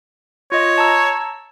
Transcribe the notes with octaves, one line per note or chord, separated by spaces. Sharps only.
F4 C#5 D#5
A5 A#5 E6